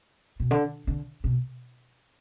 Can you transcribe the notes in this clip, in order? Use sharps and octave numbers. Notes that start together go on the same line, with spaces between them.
B2
D3
D3
B2